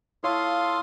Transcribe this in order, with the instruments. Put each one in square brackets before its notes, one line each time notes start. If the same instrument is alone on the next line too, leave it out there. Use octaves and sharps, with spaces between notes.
[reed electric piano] E4 C#5 [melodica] F4 A4 [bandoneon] F5 C6 D#6